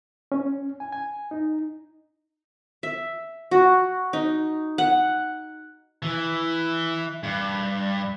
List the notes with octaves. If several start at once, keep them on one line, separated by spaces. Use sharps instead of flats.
C#4
G#5
G#5
D#4
E5
F#4
D#4
F#5
E3
G2